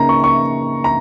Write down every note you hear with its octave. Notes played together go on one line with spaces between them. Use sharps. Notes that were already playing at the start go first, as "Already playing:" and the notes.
Already playing: C#3 A#3 D#4 A#5
C#6
C#6
A#5